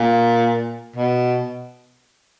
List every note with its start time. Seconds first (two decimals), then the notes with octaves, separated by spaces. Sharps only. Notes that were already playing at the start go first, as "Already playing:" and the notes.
Already playing: A#2
0.96 B2